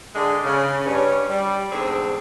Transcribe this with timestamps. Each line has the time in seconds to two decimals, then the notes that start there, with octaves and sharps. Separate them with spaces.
0.15 D3 G#3
0.44 C#3
0.86 G2 C#4
1.30 G3
1.72 E2 G#2 D3 C4 G#4